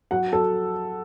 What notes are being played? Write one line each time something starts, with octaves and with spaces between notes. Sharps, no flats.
F#3 F#5
F#3 A4